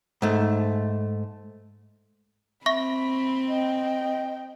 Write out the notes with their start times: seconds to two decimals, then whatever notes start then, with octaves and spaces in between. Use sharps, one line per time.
0.22 G#2 A3
2.66 C4 E5 B5 C#6 A#6
3.48 D#5 G5